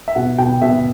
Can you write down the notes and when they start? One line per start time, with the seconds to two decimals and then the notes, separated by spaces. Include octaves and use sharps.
0.08 E5
0.15 B2 F#5
0.38 B2 G5
0.62 B2 E5